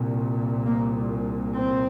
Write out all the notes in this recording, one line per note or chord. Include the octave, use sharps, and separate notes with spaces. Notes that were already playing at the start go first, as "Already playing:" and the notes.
Already playing: C2 A#2
A#3
C4